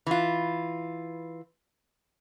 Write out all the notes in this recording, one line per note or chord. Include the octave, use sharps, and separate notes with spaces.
E3 F4